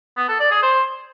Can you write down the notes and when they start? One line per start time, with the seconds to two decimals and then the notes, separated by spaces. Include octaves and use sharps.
0.17 B3
0.28 A4
0.40 D5
0.51 G#4
0.63 C5